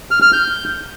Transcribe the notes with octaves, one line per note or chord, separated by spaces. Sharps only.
F6
F6
G6